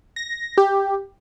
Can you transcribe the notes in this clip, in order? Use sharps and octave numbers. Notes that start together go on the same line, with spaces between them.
A#6
G4